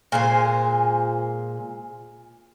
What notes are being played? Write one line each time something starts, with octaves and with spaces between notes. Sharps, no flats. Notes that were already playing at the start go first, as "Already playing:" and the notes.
A#2 G#3 C5 G#5